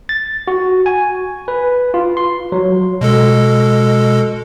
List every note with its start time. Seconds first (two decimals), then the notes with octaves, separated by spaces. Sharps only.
0.09 A6
0.48 F#4
0.86 G#5
1.48 B4
1.94 F4
2.17 C6
2.52 F#3
3.01 B2 G#3 A4